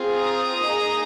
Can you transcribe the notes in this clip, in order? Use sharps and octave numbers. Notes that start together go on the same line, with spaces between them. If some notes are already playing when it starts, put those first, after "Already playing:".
Already playing: C4 F4 G#4
A#5 D#6
A#3 D#4 G#4